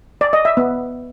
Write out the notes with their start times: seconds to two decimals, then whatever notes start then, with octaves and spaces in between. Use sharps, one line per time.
0.21 D5
0.33 D#5
0.45 E5
0.57 B3